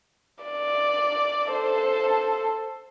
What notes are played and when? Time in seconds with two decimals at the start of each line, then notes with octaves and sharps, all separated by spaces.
0.44 D5
1.51 A4 C5